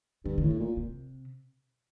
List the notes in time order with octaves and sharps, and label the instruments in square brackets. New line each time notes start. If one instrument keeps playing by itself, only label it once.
[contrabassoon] G2 [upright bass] D3
[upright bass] D#3
[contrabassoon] A2
[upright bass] D3
[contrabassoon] A#2
[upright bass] C3